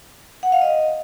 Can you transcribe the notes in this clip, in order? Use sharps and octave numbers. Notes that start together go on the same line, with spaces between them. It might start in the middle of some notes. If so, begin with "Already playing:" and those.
F#5
F5
D#5